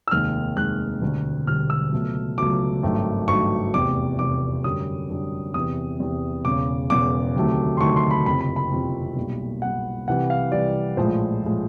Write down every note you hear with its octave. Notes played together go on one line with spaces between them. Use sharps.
E6
F1 D#2 D#3 G#3 F6
F1 D#2 D#3 G#3 F#6
E1 D2 D3 G3
E1 D2 D3 G3 F6
E6
C#2 B2 F#3 A3
C#2 B2 F#3 A3 D6
G#1 G2 D#3 F#3 A3
G#1 G2 D#3 F#3 A3 C#6
F1 E2 C3 D6
F1 E2 C3 D6
F#2 D3 G3 D#6
F#2 D3 G3
E2 C3 E3 D#6
E2 C3 E3
E1 E2 C#3 D6
E1 E2 C#3 D6
D2 C3 D#3 F#3 A3
C6
D2 C3 D#3 F#3 A3 C#6
C6
B5
F#1 F2 C3 B5
B5
B5
F#1 F2 C3
B1 A#2 G3
B1 A#2 G3 F#5
C2 C3 E3 G3 F#5
F5
C2 C3 E3 G3 D5
A#1 A2 F3 G#3 C5
A2 F3 G#3